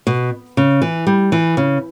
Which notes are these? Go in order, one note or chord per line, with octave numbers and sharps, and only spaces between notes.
B2
C#3
E3
G3
E3
C#3